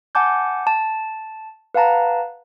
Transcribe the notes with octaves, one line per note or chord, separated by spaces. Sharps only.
F#5 G#5 A5 D6 G6
A5
B4 F5 F#5 A5 A#5